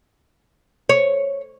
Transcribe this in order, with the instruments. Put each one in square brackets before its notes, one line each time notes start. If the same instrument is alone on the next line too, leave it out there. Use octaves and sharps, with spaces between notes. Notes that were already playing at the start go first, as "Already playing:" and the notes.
[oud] C#5